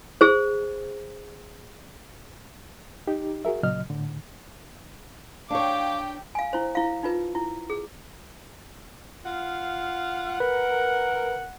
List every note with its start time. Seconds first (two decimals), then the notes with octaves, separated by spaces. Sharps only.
0.21 G#4 C5
3.07 D#4 G4
3.45 F#4 G#4 A#4 E5
3.63 A#2 C#3 F#3 D#5 F6
3.90 A2 D3
5.50 D4 G4 C#5 F5 G5 D6
6.35 F5 G#5
6.53 E4 C5
6.75 E4 F5
7.03 D#4 F4 B4
7.35 E4
7.70 G#4
9.25 F4 F5 F#5
10.40 A#4 B4 F#5